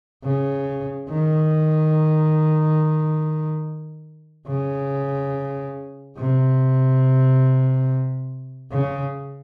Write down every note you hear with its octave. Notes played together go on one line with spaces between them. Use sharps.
C#3
D#3
C#3
C3
C#3